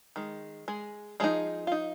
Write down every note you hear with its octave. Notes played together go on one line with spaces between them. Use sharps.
D#3 G#3
G#3 G#4
F3 G#3 D#4 G#4
F4
D#4